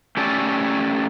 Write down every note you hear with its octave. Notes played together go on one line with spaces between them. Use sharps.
A3 C#4 G4 A4 D5